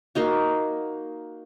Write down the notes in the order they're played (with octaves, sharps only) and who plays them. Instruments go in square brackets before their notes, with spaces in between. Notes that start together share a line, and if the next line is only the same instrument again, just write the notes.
[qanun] A#3 D#4 F#4